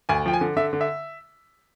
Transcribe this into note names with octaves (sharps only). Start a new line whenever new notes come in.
D2 G#5
F3 G5
G#5
D3
D3 E5
D3
E5